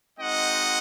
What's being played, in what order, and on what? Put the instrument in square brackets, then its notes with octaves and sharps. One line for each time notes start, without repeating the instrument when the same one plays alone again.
[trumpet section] G#3 C4 D#4 F#4 D#5 F#5